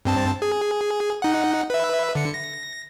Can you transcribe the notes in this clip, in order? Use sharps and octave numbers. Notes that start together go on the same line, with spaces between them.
G2 C4 A5
G#4
D#4 F#5
B4 E5
D3 C#7
A#6